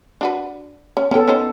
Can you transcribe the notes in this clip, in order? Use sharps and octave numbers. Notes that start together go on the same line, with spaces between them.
D4 F#4 B4
C#4
B3 C#4 A4 G5
C#4 D#4 C5